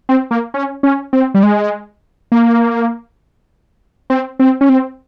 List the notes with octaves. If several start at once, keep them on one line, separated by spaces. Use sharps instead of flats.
C4
A#3
C#4
C#4
C4
G3
G#3
A#3
C4
C4
C#4
C4